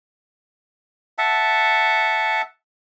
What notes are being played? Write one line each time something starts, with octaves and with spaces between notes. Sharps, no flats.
E5 F#5 A5